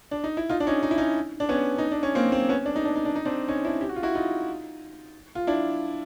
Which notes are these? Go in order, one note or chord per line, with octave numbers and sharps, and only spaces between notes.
D4
D#4
E4
D#4 F4
D4
C#4 D#4
D#4
E4
C#4 D#4
D4
B3 C#4
D#4
D4
C#4
A#3 C4
A#3 C4
B3 C#4
D4
D#4
D4
D#4
D4
D#4
C4 D4
C#4 D#4
D4 E4
G4
F#4
F4
E4 F#4
D#4 F4
F4
D4 E4